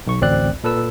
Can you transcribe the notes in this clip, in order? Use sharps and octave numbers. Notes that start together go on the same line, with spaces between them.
B1 C#6
A1 D2 C4 D5 F#6
A#2 A4 B4 E6